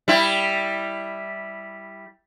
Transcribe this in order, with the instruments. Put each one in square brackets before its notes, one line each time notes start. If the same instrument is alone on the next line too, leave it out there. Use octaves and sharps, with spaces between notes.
[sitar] G3 E4